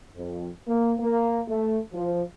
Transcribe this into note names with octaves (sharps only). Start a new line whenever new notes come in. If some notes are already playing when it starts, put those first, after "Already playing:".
F2
A#3
A#3
A3
F3